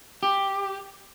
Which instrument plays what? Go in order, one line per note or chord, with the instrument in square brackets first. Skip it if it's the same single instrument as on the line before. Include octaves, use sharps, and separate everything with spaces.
[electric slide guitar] G4